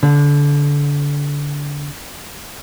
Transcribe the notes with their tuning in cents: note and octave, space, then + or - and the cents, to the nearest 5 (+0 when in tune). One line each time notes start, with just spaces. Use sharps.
D3 -25